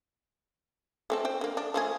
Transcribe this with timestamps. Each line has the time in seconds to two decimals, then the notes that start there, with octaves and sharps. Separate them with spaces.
1.10 A3 C4 A4
1.25 C5 G5
1.41 D3 A#3
1.57 D4
1.74 F3 A3 G#4